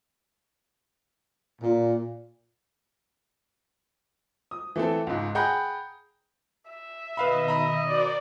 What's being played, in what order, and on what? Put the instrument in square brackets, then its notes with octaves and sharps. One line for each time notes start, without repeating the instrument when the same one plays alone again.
[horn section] A#2
[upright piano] D#6
E3 A3 C4 A4
C#2 G#2
G#4 F#5 G5 A#5 B5 G6
[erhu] E5
[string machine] B2 D#3 [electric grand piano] B4 F5 B5 [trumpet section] D#5
[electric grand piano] A#5 B5
[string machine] F#4 A#4 C5 [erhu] D5